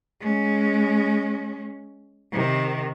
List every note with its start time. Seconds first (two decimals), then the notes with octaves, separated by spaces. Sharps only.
0.20 G#3 C#4
2.32 C3 D#3